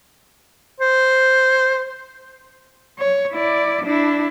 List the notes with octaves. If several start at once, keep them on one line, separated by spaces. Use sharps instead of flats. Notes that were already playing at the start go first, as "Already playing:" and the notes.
C5
C#5
E4 D5
D4 E4